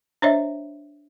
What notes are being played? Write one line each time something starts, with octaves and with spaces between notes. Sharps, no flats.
D4 C5 C#5 D#5 E5